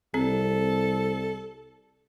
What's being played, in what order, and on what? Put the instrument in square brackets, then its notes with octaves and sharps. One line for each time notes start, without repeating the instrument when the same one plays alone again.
[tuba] C2 [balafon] C4 [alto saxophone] A4